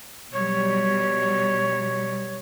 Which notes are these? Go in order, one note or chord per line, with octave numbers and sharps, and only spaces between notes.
B2 F#3 G3 C#5